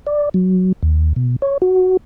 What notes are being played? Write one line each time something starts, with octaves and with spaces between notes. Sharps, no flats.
D5
F#3
D#2
B2
C#5
F#4